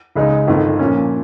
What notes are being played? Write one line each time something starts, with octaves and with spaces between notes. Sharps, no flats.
C#2 C#3 G#3 D#4
G1 F2 D#3
A#2 F3 A#3 C#4